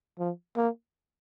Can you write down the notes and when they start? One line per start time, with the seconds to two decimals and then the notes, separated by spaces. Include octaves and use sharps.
0.19 F3
0.57 A#3